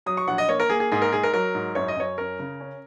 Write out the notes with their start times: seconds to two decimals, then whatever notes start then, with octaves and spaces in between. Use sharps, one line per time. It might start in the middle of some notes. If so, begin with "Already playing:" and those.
0.06 F#3 D#6
0.17 C#6
0.28 A#1 F#5
0.38 D#5
0.48 A#3 C#5
0.60 A#4
0.70 A#3 G#4
0.80 G#4
0.92 G#2 G#4
1.02 A#4
1.13 G#2 G#4
1.23 A#4
1.33 F#3 A#4
1.55 G#2
1.75 F#2 C#5
1.88 D#5
1.97 F#2 C#5
2.18 C#4 A#4
2.39 C#3
2.60 C#4